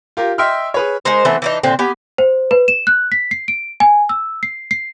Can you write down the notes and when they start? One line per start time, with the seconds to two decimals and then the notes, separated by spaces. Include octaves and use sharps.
0.17 F4 G4 A#4
0.38 D#5 E5 G5 C6 E6 F6
0.74 G#4 B4 C#5
1.05 G#3 D#4 A#4 C5
1.25 E3 A3 B3 C4
1.42 E3 D4 D#4
1.63 A#2 D3 C4
1.79 B3 G4 G#5
2.18 C5
2.51 B4
2.68 E7
2.87 F#6
3.12 B6
3.31 C7
3.48 D7
3.80 G#5
4.09 E6
4.43 C7
4.71 C7